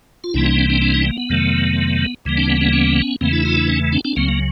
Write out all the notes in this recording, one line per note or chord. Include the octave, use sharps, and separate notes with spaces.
F4
C2 C3 E3 G3 A#3 D4 E4
C#4 D#4
C4 D4
C4 D4
C4 D4
C#4 D#4
A#3
B3
F2 C3 D#3 F#3 A3
D2 C#3 E3 G3 A#3
C4 D4
B3 C#4
B3 C#4
B3 C#4
E2 C#3 E3 A3 A#3 C4
D4 E4
D#4 F4
D4 E4
C#4 D#4
C4 D4
C4 D4
C#2 C#3 F#3 A#3 C4
A#3